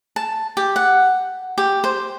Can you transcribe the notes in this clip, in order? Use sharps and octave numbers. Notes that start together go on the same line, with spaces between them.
A5
G4
F#5
G4
C5